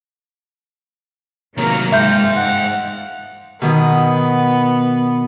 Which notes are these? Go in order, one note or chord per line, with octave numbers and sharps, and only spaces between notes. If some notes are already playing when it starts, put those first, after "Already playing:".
C3 D#3 F#3 A#3 A#4
G#2 F4 E5 F5 G5 G6
F#5
B2 D#3 B3 D#6